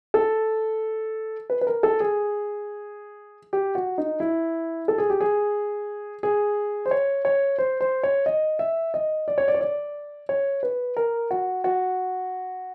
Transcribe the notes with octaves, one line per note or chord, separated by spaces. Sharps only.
A4
B4
B4
A#4
A4
G#4
G4
F#4
D#4
E4
A4
G#4
G4
G#4
G#4
C5
C#5
C#5
C5
C5
C#5
D#5
E5
D#5
D5
C#5
D5
C#5
D5
C#5
B4
A#4
F#4
F#4